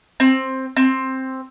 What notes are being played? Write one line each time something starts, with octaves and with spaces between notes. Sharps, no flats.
C4
C4